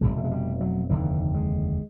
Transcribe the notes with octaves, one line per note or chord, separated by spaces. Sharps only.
F1 E2 B2 G#3
A3
G#3
G3
F#3
F1 D#2 D3 E3
G#3